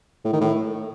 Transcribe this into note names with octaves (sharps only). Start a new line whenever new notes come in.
A2
D#3
A2